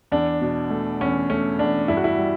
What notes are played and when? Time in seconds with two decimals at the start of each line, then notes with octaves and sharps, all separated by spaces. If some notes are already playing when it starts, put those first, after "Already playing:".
0.12 E2 D4
0.41 B2
0.70 A3
1.01 E2 C#4
1.30 A3 C#4
1.59 E2 D4
1.88 G2 E4
1.97 F#4
2.04 E4
2.18 G3